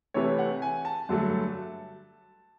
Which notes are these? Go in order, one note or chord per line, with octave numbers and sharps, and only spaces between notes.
C3 E3 A3 C#5
F#5
G#5
A5
G2 D3 F#3 A3